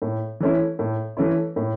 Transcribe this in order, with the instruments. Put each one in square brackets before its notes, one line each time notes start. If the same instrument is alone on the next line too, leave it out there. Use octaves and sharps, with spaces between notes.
[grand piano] A2
E3 A3 C#4 E4
A2
E3 A3 C#4 E4
A2